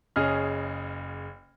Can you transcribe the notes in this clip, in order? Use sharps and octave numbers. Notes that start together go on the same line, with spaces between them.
F#1 C#3 C#4 G#4 D#5 F6